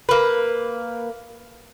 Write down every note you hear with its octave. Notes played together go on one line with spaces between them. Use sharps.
A#3 B4